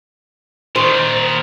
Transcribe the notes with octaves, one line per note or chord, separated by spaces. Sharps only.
A#2 D#3 C5